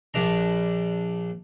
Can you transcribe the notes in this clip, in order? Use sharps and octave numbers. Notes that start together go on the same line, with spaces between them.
A#1 D4 A#5